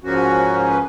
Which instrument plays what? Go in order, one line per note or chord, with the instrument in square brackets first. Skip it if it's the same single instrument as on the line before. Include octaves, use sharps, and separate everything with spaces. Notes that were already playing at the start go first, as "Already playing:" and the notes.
[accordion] G#2 F3 A#3 C#4 F#4
B4